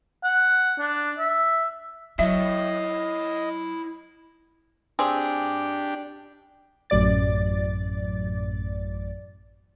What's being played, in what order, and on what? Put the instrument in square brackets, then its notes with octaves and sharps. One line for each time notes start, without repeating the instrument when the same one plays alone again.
[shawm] F#5
D4
E5
[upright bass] F#3 [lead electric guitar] E4 C#5 [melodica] D#5 [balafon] E5
[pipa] C4 G#4 [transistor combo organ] D4 G4
[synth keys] A1 F#2 D5 A6